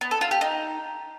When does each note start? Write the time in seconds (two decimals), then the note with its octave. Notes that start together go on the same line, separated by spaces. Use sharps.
0.01 B3
0.11 A4
0.21 F4
0.31 G4
0.41 D#4